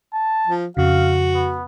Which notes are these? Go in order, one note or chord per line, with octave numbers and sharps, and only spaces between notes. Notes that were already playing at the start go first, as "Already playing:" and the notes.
A5
F3
F2 C#3 F#4 F5
B3